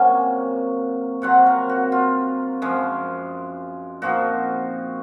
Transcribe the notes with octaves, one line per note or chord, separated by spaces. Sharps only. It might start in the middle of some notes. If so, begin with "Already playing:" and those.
Already playing: C3 F#3 A#3 C#4 G#5
C3 F#3 C4 F#5
A#4
F#4
F4
F#2 F3 G#3
A#2 F3 C4 D#4 F#4